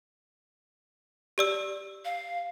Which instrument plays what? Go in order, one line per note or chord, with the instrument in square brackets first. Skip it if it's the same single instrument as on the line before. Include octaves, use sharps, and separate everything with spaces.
[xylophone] G4 D5 E6
[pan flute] F5